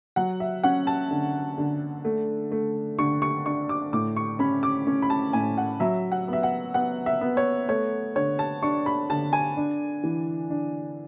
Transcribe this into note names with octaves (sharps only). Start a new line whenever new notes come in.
F#3 F#5
E5
C#4 F#5
A5
D3
D3
A3
A3
D3 C#6
C#6
D4 C#6
D6
A2 D6
C#6
C#4 B5
D6
C#4
B5
A5
A2 G#5
F#5
F#3 E5
F#5
B3 E5
F#5
B3 F#5
E5
B3
C#5
A3 C#5
D3 C#5
A5
D4 C#6
B5
D3 A5
G#5
D4
E3
D4